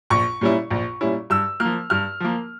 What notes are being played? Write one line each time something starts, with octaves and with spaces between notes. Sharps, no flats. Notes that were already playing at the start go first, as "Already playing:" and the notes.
A#1 C#6
A#2 G3 C#4 E4
A#1
A#2 G3 C#4 E4
G2 E6
F3 A#3 F6
G2 F6
F3 A#3